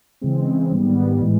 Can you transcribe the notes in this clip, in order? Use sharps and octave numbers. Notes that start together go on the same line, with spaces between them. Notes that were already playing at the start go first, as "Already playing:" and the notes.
C#3 E3 G#3 C4
G#2 D#3 G3 B3
A2 E3 G#3